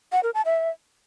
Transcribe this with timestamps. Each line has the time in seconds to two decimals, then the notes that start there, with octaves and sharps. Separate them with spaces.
0.12 F#5
0.23 A#4
0.34 A5
0.45 E5